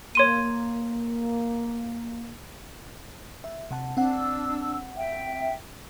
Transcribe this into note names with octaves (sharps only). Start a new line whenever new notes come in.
A#3 C#5 C6 D#7
E5
C3 F#5 A5
C4 D4 F#5 E6
E5 G5